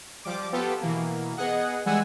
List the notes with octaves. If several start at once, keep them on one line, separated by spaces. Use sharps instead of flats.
F3 G3 D6
B3 F4 G4 A4 B4
B2 E3 A#3
B3 G#4 D#5 F#5
E3 G3 G#3 F#5 G#5 E6